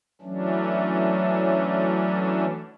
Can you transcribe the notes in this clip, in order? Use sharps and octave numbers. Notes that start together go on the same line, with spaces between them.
E3 F#3 A3 C#4 D4